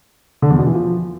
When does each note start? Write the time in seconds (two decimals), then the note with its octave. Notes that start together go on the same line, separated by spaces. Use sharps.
0.42 D3
0.50 E2
0.58 B2
0.66 E3
0.74 F3